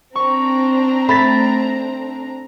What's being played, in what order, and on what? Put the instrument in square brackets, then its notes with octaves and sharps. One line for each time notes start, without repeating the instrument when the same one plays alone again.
[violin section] C4 D4 A#5 [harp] C#6
[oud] A3 [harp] B5 A6 B6